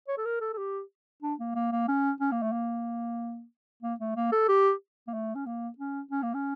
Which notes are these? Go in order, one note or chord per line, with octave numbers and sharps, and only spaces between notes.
C#5
A4
A#4
A4
A4
G4
D4
A#3
A#3
A#3
C#4
C#4
A#3
A3
A#3
A#3
A3
A#3
A4
G4
A#3
A3
C#4
A#3
C#4
C#4
A#3
C#4